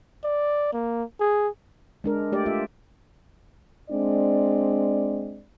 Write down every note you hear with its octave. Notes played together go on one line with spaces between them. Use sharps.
D5
A#3
G#4
G#3 D4 A#4
A3 G4 D5
F4 G4 E5
G#3 C4 D4 D5